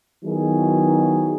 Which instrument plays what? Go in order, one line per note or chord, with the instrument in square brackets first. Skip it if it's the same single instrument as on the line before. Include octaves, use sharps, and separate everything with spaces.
[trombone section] D#3 F#3 B3 E4 G#4